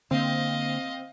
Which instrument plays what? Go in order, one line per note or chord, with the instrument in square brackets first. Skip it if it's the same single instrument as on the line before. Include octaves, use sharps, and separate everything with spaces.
[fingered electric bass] D3 A#3 [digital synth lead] C4 [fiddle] D#5 F5